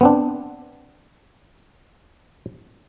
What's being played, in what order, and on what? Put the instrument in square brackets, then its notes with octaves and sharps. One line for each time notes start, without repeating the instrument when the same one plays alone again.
[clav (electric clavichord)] B3 C4 D4